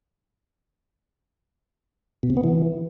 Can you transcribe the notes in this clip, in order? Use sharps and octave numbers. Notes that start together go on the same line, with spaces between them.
B2
C3
B3
E3